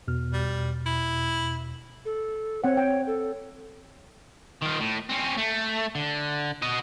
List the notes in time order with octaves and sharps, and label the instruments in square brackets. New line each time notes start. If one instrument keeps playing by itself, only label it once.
[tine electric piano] E2 B2 F6
[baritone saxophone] G3
E4
[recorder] A4
[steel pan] C4 F#5 [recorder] C#5
[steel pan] G5
[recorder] A4
[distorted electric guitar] D#3 F4
A2
C4 C#4
A3
D3
F#4 D#5